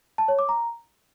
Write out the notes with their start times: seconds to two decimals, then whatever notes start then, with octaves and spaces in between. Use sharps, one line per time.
0.18 A5
0.28 C#5
0.39 D6
0.49 A#5